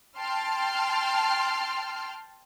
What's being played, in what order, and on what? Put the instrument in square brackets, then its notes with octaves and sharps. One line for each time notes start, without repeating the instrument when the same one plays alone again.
[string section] G5 A5 C6 F6